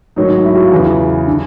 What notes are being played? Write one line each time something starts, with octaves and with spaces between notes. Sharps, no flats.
A1 G#2 D#3 F#3 D#4
E4
F#4
F4
E2 C#3 E3 E4
D3